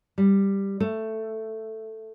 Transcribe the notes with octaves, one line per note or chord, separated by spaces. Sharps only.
G3
A3